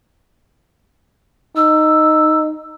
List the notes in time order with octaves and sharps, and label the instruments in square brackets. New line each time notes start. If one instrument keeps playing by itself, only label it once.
[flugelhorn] D#4 [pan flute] E6